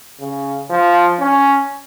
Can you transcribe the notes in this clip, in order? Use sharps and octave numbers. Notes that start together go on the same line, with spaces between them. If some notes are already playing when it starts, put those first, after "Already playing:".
C#3
F3
C#4